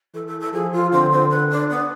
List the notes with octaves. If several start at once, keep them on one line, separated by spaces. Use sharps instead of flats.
E3 A4
A4
A4
F3 G#4
F4
D3 C4
C4
B4
D4
B3